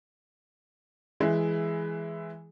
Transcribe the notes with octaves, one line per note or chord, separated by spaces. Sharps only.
E3 G#3 E4